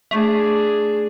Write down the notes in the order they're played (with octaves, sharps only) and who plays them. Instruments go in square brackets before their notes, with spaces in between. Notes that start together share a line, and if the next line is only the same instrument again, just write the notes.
[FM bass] A3 [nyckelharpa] D4 G#4